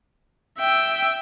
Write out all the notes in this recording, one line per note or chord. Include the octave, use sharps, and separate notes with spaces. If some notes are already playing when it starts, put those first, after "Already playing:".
E5 G5